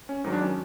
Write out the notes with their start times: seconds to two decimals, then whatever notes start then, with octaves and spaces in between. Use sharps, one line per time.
0.09 C#4
0.24 G#2 D#3 F#3 D#4
0.33 D4
0.42 C#4